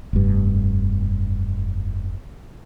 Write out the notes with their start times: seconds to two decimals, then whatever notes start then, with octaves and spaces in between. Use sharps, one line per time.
0.13 F1 G2